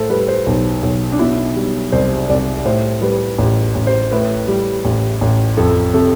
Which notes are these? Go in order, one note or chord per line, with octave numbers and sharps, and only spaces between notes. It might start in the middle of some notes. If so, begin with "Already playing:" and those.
Already playing: A2 A4 C5
G3 B4
C5
B1
B1
D4
B2 E4
G3
C2 C5
C2 D5
A2 C5
G3 B4
A1
A1
C5
A2 B4
G3
A1
A1
F2 A4
C3 A4